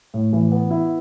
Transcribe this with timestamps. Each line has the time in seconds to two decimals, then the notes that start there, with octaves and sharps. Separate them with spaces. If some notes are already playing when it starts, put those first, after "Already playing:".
0.14 A2
0.33 E3
0.52 B3
0.71 E4